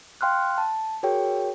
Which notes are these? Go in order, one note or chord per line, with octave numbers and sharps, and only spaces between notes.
F5 G5 C6 F6 F#6
A5
F#4 G#4 A#4 C#5 G5